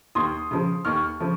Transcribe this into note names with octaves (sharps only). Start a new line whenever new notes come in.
D#2 C6 D#6
C#3 F3
D#2 C#6 F6
C#3 F3